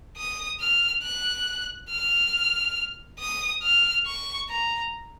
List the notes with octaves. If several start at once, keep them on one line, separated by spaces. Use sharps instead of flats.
D#6
F6
F#6
F6
D#6
F6
C#6
A#5